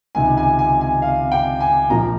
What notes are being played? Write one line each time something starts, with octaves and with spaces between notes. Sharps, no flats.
C#2 C3 D#3 G#5
G#5
G#5
G#5
F5
G5
G#5
A#1 A#2 F3 A#3 A#5